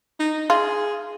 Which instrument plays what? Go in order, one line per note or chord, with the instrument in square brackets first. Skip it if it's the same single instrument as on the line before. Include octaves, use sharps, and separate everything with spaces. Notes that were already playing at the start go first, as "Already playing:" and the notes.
[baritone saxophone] D#4
[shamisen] F4 [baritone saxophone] G#4